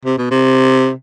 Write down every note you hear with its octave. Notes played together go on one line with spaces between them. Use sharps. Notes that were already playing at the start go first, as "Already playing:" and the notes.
C3
B2
C3